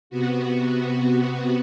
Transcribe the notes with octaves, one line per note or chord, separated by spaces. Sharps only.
C3 B3 F#4